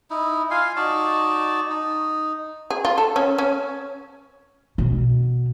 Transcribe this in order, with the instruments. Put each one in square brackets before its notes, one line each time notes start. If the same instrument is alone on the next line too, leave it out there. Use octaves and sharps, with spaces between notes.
[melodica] D#4 E4
F4 F5 G#5 C6
D#4 F#4 D5 A5
D#4
[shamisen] G#4
F4
A4
C#4
C#4
[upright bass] B2